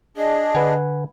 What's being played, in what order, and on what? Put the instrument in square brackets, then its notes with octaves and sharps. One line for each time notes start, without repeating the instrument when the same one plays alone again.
[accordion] D4 G#4 [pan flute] D#5
[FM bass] D3 [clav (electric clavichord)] B4 F#5 G#5